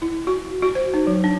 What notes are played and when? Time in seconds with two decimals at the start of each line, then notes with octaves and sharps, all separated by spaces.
0.02 E4
0.27 F#4
0.62 F#4
0.75 C5
0.94 D#4
1.07 F#3
1.24 D4